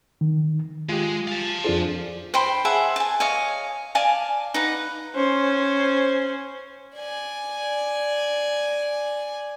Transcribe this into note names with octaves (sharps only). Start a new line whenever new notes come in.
D#3
G#3 F4 G4
F5 A5
F2 D4 F4 G#4 C5
C5 G5 B5 C6
G#4 E5 F#5 A5
G#5 A5
C#5 D#5 F5 G#5
D5 F5 G#5 A5
D#4 B4 F#5
C#4 C5
D5 G#5